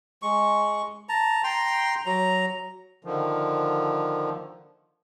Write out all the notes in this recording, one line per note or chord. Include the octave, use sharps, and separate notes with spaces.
G#3 C#6
A5 A#5
G5 A#5 C6
F#3 A#5
D3 D#3 F3